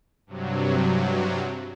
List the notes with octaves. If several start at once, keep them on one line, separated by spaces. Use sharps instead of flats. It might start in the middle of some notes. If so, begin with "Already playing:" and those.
G2 C3 F#3